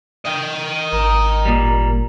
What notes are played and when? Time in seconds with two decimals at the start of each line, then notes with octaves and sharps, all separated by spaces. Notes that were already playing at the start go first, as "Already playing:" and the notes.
0.25 D#5 G5
0.93 G#1 A#4
1.45 A#2 G3